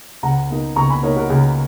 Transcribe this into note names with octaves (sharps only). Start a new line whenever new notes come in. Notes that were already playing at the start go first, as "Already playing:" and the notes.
C#2 F#5 A#5
B2 A#3 D#4
C#2 A#5 C#6
G#5 B5
B2 A#3 D#4 A#4 C#5
F#4 A#4
C#2 G#4